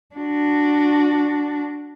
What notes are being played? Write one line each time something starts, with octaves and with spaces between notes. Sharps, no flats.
D4 F#4